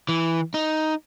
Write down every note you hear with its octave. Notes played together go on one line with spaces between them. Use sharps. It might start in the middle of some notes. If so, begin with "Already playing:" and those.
E3
D#4